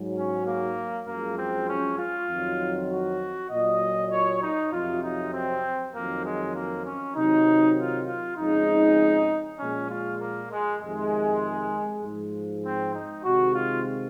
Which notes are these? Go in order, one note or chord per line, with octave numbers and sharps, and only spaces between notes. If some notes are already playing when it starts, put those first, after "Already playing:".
Already playing: G#2 F#3
C#4
A#3
F#2 F3 G#3 A#3
C4
C#4
F4
F2 D#3 F#3
F#4
A#2 F#3 D#5
C#5
D#4
F2 C3 F#3 F4
D#4
C4
F2 D#3 F#3 A#3
G#3
A#3
C#4
C3 D#3 F#3 D#4
F4
F4
F2 C#3 G#3 D#4
A#2 F3 G#3 C#4
F4
A#3
G#3
F2 C3 D#3 G#3
G#2 F3 G#3
C4
D#4
C3 D#3 G#3 F#4
F4